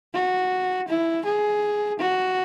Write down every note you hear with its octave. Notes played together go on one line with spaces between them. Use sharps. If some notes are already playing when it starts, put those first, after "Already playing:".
F#4
E4
G#4
F#4